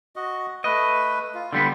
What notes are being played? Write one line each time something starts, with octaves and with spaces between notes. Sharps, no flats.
F#4 D#5
A3 B4 D#5
F4
D3 G3 B3 C6